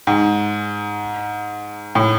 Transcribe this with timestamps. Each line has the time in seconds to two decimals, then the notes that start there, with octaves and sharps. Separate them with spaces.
0.07 G#2
1.95 A2